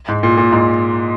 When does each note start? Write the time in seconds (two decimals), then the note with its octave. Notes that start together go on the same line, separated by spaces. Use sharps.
0.08 G#2
0.23 A#2
0.37 A#2
0.52 G#2